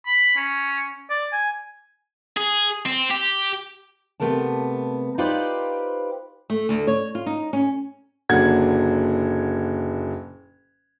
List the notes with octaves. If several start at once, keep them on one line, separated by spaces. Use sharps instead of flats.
B5
C#4
D5
G#5
G#4
C4
G4
C3 F#3 A3 B3 A#4 A5
D#4 F4 G4 B4 C5 D5
A3
D2
C#5
F4
D#4
C#4
F#1 A#2 D3 F#3 F#5 G#6